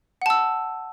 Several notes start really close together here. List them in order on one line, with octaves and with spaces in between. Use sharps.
F#5 A5 E6